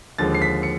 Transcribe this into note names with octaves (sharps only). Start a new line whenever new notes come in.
D#2 D3 F3 G#3 A6
C7
B6
C#7